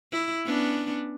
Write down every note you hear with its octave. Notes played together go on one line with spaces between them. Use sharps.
E4
B3 C#4 D4